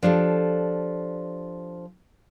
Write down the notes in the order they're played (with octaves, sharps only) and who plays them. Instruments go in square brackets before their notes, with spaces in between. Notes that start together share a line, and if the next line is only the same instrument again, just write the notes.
[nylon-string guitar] F3 D4 G4 A4